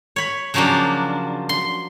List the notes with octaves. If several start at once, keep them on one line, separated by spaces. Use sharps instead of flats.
C#5 B5
C#3 F3 F#3 A#3 D4
C6